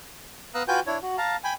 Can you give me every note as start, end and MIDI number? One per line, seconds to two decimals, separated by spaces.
0.55 0.63 59
0.55 0.63 77
0.55 0.63 82
0.55 0.63 87
0.55 0.63 88
0.55 0.63 90
0.68 0.80 65
0.68 0.80 66
0.68 0.80 71
0.68 0.80 79
0.68 0.80 80
0.68 0.80 91
0.87 0.98 62
0.87 0.98 64
0.87 0.98 73
1.02 1.16 66
1.18 1.36 77
1.18 1.36 81
1.18 1.36 82
1.44 1.54 79
1.44 1.54 80
1.44 1.54 83